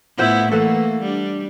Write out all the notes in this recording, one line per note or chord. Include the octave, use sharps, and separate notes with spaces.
A2 B3 E4 F4 C5 F#5
E3 A3 A#3 A4 B4 F#5
G3 D4